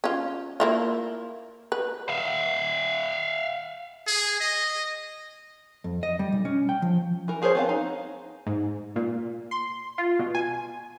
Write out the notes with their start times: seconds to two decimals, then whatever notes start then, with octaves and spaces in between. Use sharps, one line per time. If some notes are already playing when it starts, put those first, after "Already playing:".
0.04 C#4 F4
0.60 A#3 E4 F4
1.72 B4
2.09 E5 F5
4.07 G#4
4.41 D#5
5.84 F2
6.03 D#5
6.19 G3
6.32 B1
6.45 C#4
6.69 G5
6.82 F3
7.28 E3 A#4
7.42 F3 G#4 A#4 C5 C#5
7.55 B3 C4 F5
7.69 D#4
8.47 G#2
8.96 A#2
9.51 C6
9.98 F4
10.19 B2
10.35 G#5